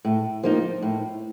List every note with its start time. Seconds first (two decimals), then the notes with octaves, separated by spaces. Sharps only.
0.05 A2
0.43 F3 A#3 D#4
0.82 A2